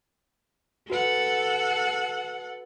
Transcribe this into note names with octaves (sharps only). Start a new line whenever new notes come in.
F#4 A4 B4 F#5